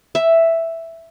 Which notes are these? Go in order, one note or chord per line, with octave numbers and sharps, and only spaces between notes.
E5